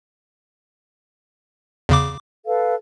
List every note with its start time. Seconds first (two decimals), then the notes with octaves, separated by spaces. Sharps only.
1.89 E2 C#3 D6
2.47 A4 B4 F5